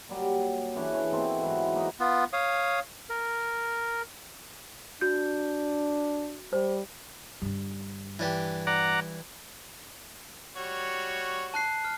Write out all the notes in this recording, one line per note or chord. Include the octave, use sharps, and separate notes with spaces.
A#2 F#3 G3
C#3 E3 C#4 D4
C#5 E5
B2 E3 C4 A4
G#2 E3 F#3
A#3 D#4 B4 D#5
B3 F4
C#5 F5 D#6
A#4
D4 F#4 G6
G3 C5
G2 D3 G3
E3 D4 G4
D5 F#5 A#5
G3 F#4 C#5
A5 F#6 C7
F6